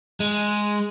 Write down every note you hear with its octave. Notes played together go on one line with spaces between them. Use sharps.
G#3